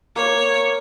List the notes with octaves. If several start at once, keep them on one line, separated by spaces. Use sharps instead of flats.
A#3 C#5